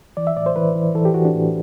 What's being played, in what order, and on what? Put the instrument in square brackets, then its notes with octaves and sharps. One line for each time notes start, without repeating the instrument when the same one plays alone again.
[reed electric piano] E3 D5
E5
A2 D5
C5
E3 B4
E3
E3 A4
G4
E3 F#4
D4
A2